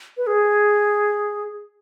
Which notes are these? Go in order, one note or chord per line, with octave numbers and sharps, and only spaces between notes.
B4
G#4